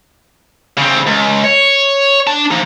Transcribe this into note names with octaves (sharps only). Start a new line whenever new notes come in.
C#3 C4
C#2
C#5
D4 A5
F3 D#4